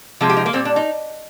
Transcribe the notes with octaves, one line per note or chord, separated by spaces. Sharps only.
C3 F3 G#3
G4
D#4
A#3
A#2 G3 C4
D4
D#4